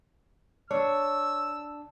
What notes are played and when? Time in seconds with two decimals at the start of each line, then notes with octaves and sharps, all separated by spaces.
0.71 D4 C#5 E6